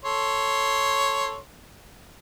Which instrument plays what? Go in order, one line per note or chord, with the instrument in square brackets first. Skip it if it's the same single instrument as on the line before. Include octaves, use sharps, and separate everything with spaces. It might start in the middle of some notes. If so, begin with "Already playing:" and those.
[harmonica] A4 C#5 C6